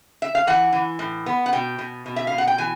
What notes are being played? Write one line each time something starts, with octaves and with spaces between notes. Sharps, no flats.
E5
F5
E3 F#5
E3
A2
B3
F#5
B2 G5
B2
B2
E5
B2 F5
F#5
G5
E3 G#5